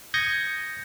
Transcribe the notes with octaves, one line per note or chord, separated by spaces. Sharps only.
D#6 G6 G#6 A#6 C#7